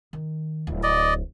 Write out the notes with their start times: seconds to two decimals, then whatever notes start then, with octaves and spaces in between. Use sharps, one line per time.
0.13 D#3
0.67 D1
0.83 D5 D#5